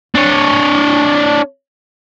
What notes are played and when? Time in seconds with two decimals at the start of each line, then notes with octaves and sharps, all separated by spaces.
0.15 D4 C#5